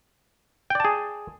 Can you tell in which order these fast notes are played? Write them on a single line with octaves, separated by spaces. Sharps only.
G5 D5 A5 G#4